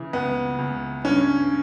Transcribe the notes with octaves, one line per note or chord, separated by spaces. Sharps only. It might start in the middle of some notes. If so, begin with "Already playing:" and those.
Already playing: C#3 E3
C#2 B3
C#2
G2 C#4